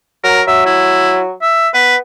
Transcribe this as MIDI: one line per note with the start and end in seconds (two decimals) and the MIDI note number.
0.24 0.42 54
0.24 0.42 70
0.47 1.33 54
0.47 0.64 76
0.66 1.22 64
1.42 1.69 76
1.74 1.98 59
1.74 1.96 71